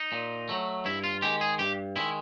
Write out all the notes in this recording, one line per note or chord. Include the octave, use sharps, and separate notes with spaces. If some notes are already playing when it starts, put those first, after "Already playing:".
Already playing: D#4
A#2
F#3 A3
G2 E4
F4
D#3 G#3 G4
G#4
G2 G4
D#3 G#3 E4